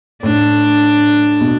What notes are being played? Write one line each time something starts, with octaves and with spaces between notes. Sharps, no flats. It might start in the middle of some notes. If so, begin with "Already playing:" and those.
A2 D4
B2